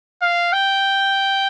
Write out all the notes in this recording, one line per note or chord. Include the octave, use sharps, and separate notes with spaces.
F5
G5